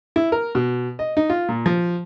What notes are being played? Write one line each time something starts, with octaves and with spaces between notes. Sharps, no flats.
E4
A#4
B2
D#5
D#4
F4
A#2
F3